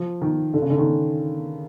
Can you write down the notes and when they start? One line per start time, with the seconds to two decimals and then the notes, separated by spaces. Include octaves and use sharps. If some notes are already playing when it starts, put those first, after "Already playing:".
Already playing: F3
0.21 D#3
0.54 D3
0.62 C#3
0.70 D3
0.78 D#3